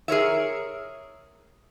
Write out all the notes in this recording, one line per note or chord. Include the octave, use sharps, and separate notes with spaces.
G#4 A#4 C#5 E5